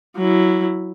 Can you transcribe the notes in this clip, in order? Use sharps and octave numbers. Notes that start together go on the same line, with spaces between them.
F#3 E4